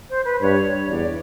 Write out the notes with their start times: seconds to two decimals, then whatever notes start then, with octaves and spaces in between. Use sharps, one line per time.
0.10 C5
0.25 B4
0.41 G2 C#5
0.89 E2 D5